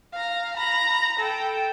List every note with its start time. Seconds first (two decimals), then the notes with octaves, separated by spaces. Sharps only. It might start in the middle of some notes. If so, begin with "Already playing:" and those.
0.13 F5 A#5
0.57 A#5 B5
1.19 A4 G5